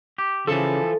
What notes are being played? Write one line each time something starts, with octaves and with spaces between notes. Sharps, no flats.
G4
C#3 E3 F3 A4